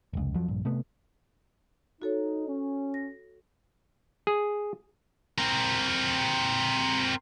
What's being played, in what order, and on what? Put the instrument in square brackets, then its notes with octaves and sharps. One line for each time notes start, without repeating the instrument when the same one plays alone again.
[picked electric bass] F1 C#2
F2 F3 F#3
A#1 G2
C3 A3 B3
[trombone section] D#4 [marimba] F#4 A4 C#5
[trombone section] C#4
[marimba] A#6
[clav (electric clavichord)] G#4
[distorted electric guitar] C4 A#4